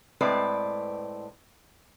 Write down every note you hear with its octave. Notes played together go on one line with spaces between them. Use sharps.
A2 G#3 C4 B4 D5